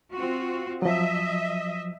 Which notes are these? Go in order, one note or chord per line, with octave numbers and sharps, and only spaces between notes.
C4 F4 F#4
F3 F#3 D#5 E5